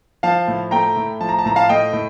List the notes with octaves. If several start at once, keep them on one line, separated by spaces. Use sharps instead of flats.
F3 F5 A5
A2
A3 G5 A#5
A2
F3 A5
A#5
A5
A2 A#5
F5 A5
A3 D#5 G5
A2